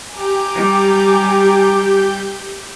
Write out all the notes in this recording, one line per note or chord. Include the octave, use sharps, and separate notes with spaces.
G4 G#5 A#5 D6 G6
G3